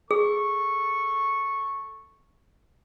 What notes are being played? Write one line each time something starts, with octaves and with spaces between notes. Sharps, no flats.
G#4 A4 C#6